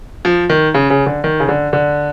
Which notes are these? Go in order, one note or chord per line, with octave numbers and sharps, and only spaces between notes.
F3
D#3
C#3
C#3
D3
D#3
C#3
D3
D3